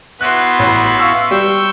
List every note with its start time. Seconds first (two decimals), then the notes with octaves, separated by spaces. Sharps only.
0.21 B3 E4 F#4 B4 C6 F#6
0.59 A1
0.98 F5 C#6 E6
1.31 G3 G5 C#6 E6